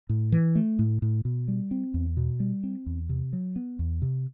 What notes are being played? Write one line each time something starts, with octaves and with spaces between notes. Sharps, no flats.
A2
E3
A3
A2
A2
B2
G3
C4
E2
B2
G3
C4
E2
C3
F#3
B3
E2
C3